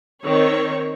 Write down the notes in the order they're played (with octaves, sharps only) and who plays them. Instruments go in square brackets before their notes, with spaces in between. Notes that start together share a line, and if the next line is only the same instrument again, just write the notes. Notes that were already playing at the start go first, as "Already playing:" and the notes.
[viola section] D#3 C4 C#5